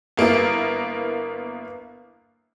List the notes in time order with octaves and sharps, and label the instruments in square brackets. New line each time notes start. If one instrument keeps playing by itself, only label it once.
[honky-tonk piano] G1 A#3 B3 E4 A#4